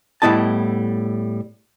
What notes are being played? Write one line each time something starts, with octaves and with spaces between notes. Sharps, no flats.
A2 G3 B3 E4 D#5 A5